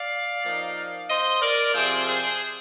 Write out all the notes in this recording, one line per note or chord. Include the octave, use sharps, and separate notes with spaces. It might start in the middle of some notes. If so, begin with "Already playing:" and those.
Already playing: D5 F5
F3 A#3 D#4
C5 D#5
A#4 D5
C3 F3 C4 G#4 C5
G#4 C5